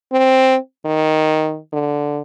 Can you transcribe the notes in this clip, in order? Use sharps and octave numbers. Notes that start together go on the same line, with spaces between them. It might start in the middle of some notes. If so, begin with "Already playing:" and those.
C4
D#3
D3